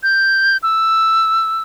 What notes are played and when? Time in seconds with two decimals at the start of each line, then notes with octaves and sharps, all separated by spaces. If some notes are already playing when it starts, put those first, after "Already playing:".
0.03 G6
0.63 E6